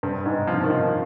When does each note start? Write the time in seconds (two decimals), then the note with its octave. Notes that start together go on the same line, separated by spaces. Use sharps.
0.03 G2
0.26 G#2
0.47 F3
0.64 D#3
0.70 F3